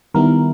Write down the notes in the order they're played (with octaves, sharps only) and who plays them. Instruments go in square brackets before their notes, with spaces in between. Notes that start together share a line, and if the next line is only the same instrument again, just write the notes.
[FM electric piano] D#3 G3 B3 E4 A#4